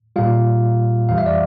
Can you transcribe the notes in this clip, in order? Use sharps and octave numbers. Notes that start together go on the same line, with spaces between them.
A#2 G3 F4 F5
F2 E3 G3 F5
E5
D5